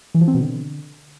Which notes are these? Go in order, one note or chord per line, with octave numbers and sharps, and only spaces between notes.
E3
F3
C4
B2
D3